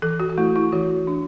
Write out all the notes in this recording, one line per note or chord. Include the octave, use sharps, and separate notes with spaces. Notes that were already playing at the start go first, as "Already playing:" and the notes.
E3 A4
F#4
F#4
A3 E4
E4
E3 F#4
D4